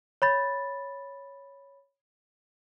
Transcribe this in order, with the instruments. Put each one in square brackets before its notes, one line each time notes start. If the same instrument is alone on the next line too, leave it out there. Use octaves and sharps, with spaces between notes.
[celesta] C#5 B5 A6